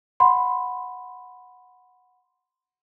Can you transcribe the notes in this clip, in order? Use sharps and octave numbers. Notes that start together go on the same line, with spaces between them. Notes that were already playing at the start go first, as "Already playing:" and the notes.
F#5 B5 C6